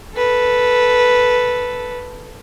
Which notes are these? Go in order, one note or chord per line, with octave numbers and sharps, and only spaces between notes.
A4 B4